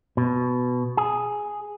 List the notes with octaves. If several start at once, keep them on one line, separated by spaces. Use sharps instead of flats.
B2
G#4